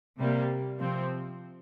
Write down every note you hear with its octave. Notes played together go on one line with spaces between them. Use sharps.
C3 G3 A#3
C3 F3 C4